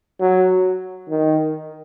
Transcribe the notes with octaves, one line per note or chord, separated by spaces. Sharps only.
F#3
D#3